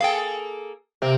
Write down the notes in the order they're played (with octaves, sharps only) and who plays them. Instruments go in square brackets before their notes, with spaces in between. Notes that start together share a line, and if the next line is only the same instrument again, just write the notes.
[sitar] A#3 G#4 A4 [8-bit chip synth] F5 G5
[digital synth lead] C3 [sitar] A#3 A#4